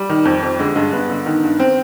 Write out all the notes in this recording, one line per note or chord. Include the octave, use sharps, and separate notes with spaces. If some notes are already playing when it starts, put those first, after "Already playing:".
Already playing: G3
D#3
F2
F2
D3 G#3
G2 G#3
G2 B3
D3
D#3
G2
C4